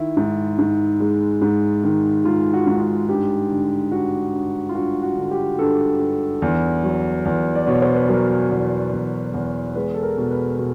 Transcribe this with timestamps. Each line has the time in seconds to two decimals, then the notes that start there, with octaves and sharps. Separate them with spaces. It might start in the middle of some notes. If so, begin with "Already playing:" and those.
Already playing: D#3 E4
0.17 G#2
0.58 G#2
1.00 G#3
1.41 G#2
1.84 D#3
2.25 G#2 F4
2.53 F#4
2.67 G#2
2.81 F#4
3.08 G2 G4
3.51 D3
3.92 G2 F#4
4.34 G2
4.69 F4
4.75 G2 F#4
5.03 F#4
5.17 D3
5.31 G4
5.59 G2 A4
6.00 G2
6.42 E2
6.84 F#3
7.25 E2
7.55 D5
7.67 B2 C#5
7.82 C5
7.95 B4
8.09 F#3 A#4
8.51 E2
8.93 E2
9.34 E2
9.75 G#3 B4
9.94 A4
10.03 A#4
10.17 B2
10.31 B4
10.59 B2